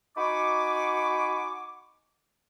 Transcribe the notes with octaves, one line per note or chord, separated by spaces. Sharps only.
D#4 F#4 G#5 B5 C#6 D6